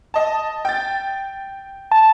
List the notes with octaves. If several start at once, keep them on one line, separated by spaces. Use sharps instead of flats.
D#5 A5
G5 A6
A5